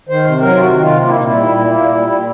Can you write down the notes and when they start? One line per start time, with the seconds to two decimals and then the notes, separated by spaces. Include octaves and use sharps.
0.09 D#3 C5
0.25 C3
0.40 F#3 A#4
0.55 C3 F4
0.61 F#4
0.71 D#3
0.81 F4
0.87 C3
1.02 A#3 F4
1.09 E4
1.17 A#2 D#4
1.25 E4
1.33 G3
1.49 A#2
1.64 A#3
1.80 A#2
1.95 G3
2.11 A#2